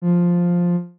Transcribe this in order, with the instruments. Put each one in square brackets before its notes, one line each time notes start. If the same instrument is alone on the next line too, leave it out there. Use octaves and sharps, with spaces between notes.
[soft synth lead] F3